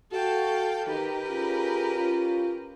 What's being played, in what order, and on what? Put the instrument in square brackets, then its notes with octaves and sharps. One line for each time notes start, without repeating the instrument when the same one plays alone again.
[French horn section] F#4 [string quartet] A4 F5 G5
[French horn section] D#3 [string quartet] G4 A#4 B4
[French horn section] C#4 F4 G#4
C#4 F4